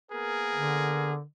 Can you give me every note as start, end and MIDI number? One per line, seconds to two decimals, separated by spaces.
0.12 1.13 58
0.12 1.13 59
0.12 1.14 68
0.12 1.13 70
0.55 1.23 50